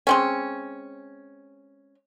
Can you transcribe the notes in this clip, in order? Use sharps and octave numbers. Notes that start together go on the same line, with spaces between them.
G#3 C4 C#4